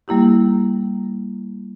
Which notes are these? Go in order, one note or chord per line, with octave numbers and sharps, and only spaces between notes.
G3 A#3 E4 G4